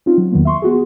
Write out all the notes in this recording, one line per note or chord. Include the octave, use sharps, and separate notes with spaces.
C4 C#4 D#4 F4
F#3
E2 D#3 F#3 A#3 B3
E5 C6 C#6
B3 F#4 G#4